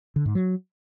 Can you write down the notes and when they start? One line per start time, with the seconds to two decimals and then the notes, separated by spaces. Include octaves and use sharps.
0.16 D3
0.26 G#2
0.35 F#3